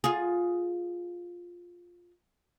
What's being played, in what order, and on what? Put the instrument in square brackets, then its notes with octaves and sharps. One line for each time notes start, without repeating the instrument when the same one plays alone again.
[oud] F4 G#4